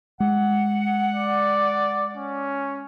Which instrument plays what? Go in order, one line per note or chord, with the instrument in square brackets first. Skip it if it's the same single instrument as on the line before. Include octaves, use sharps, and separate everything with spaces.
[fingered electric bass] G#3 [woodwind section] F#5
[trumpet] D5
C#4